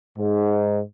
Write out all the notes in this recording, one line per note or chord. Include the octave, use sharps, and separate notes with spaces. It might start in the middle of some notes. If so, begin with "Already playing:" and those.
G#2